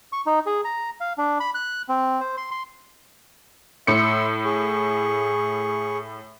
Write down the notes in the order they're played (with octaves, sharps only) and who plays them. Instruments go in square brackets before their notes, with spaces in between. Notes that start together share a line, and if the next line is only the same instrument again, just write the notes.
[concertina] C#6
D#4
G#4
A#5
F5
D4
B5
F#6
C4
C5
C6
C6
[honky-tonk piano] A2 C#7 [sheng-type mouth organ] E5 C6 E6
[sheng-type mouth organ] G#4 C#6